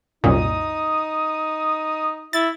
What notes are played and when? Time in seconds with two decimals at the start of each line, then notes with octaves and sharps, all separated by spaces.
0.24 C2 F#2 A#2 D#4 D#6
2.33 E4 A6